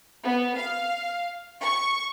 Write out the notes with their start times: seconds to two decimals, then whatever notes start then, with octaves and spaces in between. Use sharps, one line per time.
0.24 B3
0.57 F5
1.62 C#6